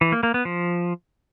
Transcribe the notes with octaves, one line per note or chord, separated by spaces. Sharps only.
E3
A#3
A#3
B3
F3